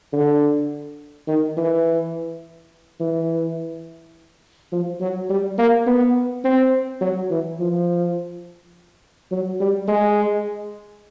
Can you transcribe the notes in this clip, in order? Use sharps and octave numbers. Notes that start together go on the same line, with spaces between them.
D3
D#3
E3
E3
F3
F#3
G3
A#3
B3
C4
F#3
E3
F3
F#3
G3
G#3